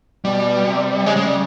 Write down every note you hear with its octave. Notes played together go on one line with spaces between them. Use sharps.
B2 G3
C3
C#3 G#3
G#3
G3